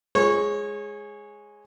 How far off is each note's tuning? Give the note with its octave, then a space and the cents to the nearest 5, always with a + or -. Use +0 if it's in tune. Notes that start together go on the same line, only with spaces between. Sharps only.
G#3 +0 C#5 -25 C#6 +0